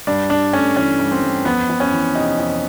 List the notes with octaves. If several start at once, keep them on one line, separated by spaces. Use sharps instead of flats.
G2 D4
G2 D4
A3 C#4
E3 C#4
G2
C4
G2
F2 B3
F2
C#4
E3
C3 D#4
F2